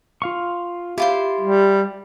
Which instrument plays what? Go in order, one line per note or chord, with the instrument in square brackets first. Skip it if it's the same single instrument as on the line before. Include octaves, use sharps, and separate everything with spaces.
[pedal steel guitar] F4 F5 C#6
[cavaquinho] E4 F4 C5 [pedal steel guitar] G4
[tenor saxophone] G3